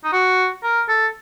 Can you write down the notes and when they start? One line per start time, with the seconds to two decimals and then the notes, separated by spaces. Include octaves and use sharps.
0.04 D#4
0.13 F#4
0.63 A#4
0.89 A4